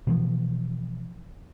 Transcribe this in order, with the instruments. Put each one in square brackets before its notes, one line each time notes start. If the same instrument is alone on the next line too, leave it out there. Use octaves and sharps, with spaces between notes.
[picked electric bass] B2 E3 F3